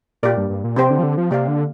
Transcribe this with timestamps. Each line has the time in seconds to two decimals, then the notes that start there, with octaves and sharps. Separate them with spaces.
0.23 A#2 A#3 G4 A#4 D5
0.37 G2
0.50 G2
0.64 A#2
0.76 C3 C4 G4 C5 G5
0.90 D3
0.99 F3
1.03 D3
1.17 F3
1.31 C3 A#3 G4 D5 F5
1.48 D3